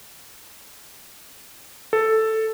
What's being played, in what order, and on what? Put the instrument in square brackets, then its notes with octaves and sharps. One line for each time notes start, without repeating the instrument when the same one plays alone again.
[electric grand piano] A4